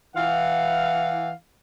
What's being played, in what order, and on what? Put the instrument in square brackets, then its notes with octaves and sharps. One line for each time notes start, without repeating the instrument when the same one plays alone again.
[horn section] E3 F5 F#5